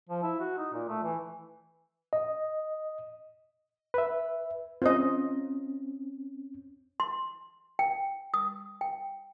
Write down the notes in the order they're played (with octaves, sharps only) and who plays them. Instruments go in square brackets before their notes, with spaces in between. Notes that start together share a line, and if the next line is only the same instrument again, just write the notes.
[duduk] F3
E4
F#4
D#4
A#2
A3
E3
[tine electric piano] D#5
[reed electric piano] B4 E5
[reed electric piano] C4 C#4 [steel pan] F4 C5 D#5
[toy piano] C6
G5
D#6
G5